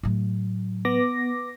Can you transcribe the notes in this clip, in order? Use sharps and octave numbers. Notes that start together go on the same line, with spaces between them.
A2 F#3
B3 D6 A#6